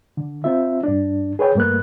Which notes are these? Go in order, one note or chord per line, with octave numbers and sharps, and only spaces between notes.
D3
C4 F4 E5
G2 D4
G#4 B4 C#5 G5
G2 A3 A#3 B4 F#6